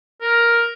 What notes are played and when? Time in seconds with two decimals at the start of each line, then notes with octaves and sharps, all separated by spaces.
0.21 A#4